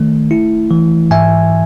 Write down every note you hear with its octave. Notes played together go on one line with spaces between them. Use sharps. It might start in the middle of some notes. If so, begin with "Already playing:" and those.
Already playing: D#3 A3
E4
E3
G#2 E5 G#5